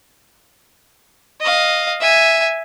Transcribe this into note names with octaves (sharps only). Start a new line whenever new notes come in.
D#5 F5
E5 G#5